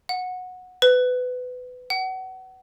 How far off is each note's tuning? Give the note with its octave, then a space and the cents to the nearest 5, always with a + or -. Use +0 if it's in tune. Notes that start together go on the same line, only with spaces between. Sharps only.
F#5 -15
B4 +20
F#5 +30